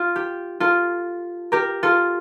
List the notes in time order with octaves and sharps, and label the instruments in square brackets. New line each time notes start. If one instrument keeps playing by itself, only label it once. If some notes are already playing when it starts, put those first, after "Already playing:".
Already playing: [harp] F4
G4
F4 A4
G4 A#4
F4 A4